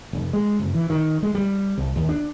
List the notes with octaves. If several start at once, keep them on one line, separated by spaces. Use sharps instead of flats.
F1
G#3
F#1
E3
D#3
G#3
G3
C2
D#2
D4